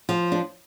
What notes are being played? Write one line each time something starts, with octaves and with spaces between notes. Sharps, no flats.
F3
D4